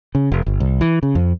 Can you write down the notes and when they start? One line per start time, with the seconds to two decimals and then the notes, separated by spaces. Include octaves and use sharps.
0.15 C#3
0.32 F1
0.46 G1
0.60 C2
0.81 E3
1.03 C#3
1.15 F2